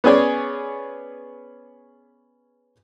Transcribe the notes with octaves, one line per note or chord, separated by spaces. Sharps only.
B3 C#4 G#4 C#5 D5